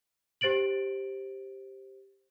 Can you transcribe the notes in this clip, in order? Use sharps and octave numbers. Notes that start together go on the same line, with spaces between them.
G4 C5 A6 D7 F#7